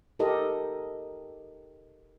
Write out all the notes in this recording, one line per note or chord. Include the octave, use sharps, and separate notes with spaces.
D#4 G4 A4 A#4 D#5